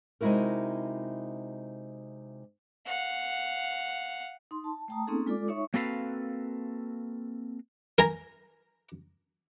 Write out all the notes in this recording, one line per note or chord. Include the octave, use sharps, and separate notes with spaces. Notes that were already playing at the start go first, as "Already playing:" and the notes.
C3 G#3 D#4 E4 F#4 A#4
F5 F#5
D#4 C6
A5
A3 G5 A5 A#5 D#6
A#3 C4 C#4 D#4 G#4 A4
G#3 F4 A4 D5 D6
D#4 C#5 E5 C#6
A#3 C4 F#4 A4 B4 F5
A#4 G#5 A#5